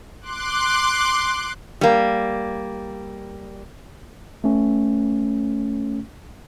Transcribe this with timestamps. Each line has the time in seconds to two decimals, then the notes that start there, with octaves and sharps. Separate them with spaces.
0.21 C6 D6 F#6
1.81 G3 A#3
4.44 A3 C#4